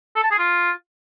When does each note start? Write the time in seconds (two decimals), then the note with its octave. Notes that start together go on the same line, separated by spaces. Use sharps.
0.16 A4
0.23 A5
0.31 G#4
0.39 F4